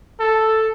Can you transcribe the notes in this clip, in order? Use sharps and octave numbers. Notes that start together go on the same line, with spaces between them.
A4